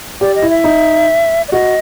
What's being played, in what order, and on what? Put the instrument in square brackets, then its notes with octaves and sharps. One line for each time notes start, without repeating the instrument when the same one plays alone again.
[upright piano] G4 [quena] D5
[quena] D#5
[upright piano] E4
[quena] E5
[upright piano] D#4
[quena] D5
[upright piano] F#4 [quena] D#5